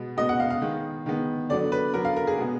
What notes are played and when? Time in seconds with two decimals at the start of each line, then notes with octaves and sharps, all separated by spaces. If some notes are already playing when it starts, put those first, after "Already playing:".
Already playing: B2 G#3 B3
0.17 B2 G#3 B3 D#5
0.29 F#5
0.40 F5
0.50 F5
0.61 D#3 G#3 B3
1.06 D#3 G#3 B3
1.49 D3 F#3 B3 D5
1.72 B4
1.94 D3 F#3 B3 A#4
2.05 F5
2.16 A#4
2.27 G#4
2.38 B2 G#3 B3